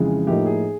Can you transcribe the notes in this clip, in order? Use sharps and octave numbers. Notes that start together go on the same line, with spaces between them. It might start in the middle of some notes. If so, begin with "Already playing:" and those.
Already playing: F2 C#3 E3 G#3
A2 F3 A#3 D#4 G4
G#4